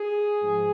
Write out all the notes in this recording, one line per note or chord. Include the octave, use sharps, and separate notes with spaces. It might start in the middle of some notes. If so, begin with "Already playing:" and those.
Already playing: G#4
G#2 F3